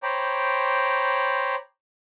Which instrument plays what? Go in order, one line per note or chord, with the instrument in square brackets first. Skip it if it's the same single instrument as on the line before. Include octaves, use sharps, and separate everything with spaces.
[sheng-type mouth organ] C5 C#5 G5 A#5 B5 D6